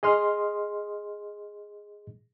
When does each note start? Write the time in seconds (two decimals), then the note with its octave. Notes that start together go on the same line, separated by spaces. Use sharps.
0.03 G#4 D#5 C6 F6